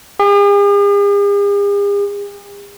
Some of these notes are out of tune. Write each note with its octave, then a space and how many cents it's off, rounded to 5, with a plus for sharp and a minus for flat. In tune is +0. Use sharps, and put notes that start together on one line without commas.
G#4 -45